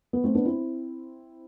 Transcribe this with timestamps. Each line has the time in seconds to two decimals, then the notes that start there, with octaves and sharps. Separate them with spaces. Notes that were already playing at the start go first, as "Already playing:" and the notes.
0.13 B3
0.24 A3 C4
0.35 B3 D4
0.45 C4 E4